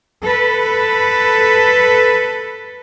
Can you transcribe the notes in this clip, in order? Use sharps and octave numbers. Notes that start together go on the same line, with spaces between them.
A4 B4